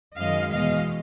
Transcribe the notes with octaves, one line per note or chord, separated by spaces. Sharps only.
F#2 D#3 G#3 D#5 F5
E2 B2 G#3 D#5 F5